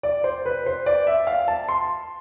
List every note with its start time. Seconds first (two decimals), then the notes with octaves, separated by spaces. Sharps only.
0.03 D5
0.24 C5
0.45 B4
0.66 C5
0.86 D5
1.07 E5
1.27 F5
1.48 A5
1.69 C6